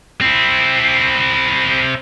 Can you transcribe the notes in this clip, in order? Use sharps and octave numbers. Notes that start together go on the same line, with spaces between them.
C4 E4